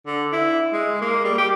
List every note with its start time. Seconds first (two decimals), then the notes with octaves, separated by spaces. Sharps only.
0.07 D3
0.32 E4
0.73 G#3
1.02 A#3
1.25 G3
1.38 G4